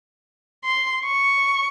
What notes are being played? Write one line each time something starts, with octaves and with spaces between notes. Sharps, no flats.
C6
C#6